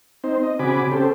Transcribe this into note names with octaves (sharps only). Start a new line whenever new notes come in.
C4 D#4 C5
D#5
C#3 C4 F#4 G#5 B5 D6
C#4 G4 A4 C5